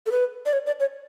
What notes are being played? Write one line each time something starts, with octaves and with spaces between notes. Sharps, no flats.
A4
B4
D5
C#5
D5
C#5